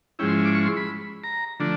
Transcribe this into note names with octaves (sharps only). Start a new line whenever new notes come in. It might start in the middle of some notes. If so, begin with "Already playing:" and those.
G#2 F3 G#3 C#4 E4 G5
C6
D6
C#6
C6
B5
A#5
D3 F3 A3 D4